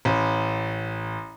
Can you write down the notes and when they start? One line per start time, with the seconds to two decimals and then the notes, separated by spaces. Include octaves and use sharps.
0.05 A1